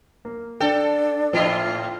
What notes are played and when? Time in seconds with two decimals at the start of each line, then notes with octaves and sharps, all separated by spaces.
0.25 A#3
0.60 D4 A4 G5
1.33 A2 F3 E4 F4 D#5